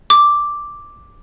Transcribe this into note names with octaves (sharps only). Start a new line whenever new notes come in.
D6